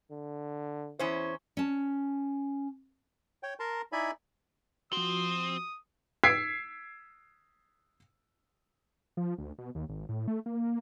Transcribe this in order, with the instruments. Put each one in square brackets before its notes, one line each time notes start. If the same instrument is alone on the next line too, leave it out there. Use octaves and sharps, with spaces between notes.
[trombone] D3
[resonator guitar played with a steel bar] E2 C#4 C5 [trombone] E4
[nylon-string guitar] C#4 A5
[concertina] C#5 G5
A#4 A5 A#5 C6
D#4 E4 D5 E5 G#5 B5
[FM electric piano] F3 F#4 [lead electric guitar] C4 [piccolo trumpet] D#6
[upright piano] E6 G#6 B6 C7 D7
[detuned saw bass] F3
D2
B2
D#2
G#1
A2
A3
A#3